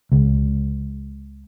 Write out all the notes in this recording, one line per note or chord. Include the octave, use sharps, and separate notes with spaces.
C#2